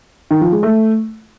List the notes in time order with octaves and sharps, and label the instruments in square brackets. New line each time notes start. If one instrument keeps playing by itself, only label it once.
[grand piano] D#3
F3
G#3
A3